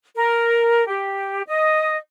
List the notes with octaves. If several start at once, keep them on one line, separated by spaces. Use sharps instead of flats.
A#4
G4
D#5